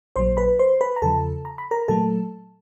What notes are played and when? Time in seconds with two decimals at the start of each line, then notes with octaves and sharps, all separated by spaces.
0.16 A#1 A#2 F#3 C5 C6
0.37 B4 B5
0.59 C5 C6
0.81 B4 B5
0.96 A#5
1.02 E2 C#3 F3 A4 A5
1.45 A#5
1.58 B5
1.71 A#4 A#5
1.88 A#2 F#3 A3 A4 A5